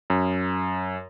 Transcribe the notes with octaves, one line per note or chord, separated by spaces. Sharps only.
F#2